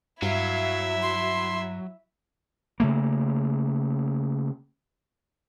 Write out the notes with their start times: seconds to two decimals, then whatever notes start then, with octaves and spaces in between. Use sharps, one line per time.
0.22 G2 F#3 E4 E5 F5
1.02 C6
2.80 C#3 A3 A#3